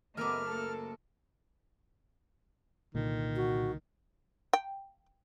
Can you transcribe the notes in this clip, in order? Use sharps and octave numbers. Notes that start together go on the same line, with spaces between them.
F#1 A3 B3 A#4 D#5 E5 D6 F6
A#3 A4
C2 A#2 D3 D#3 A#3
F#4
G5